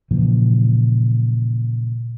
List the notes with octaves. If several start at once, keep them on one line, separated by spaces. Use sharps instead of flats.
A#2 C#3 E3 F3